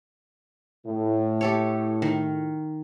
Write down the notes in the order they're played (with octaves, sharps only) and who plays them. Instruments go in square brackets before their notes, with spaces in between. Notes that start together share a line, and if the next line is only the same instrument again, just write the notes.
[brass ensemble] A2
[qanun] G4 A4 C#5
D#3